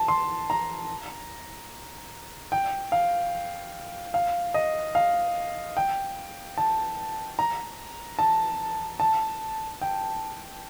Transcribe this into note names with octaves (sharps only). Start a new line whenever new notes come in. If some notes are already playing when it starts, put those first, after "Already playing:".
Already playing: A5
C6
A#5
G5
F5
F5
D#5
F5
G5
A5
A#5
A5
A5
G5